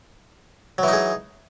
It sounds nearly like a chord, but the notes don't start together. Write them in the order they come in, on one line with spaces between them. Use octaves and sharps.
F#3 E3 D#4 G#4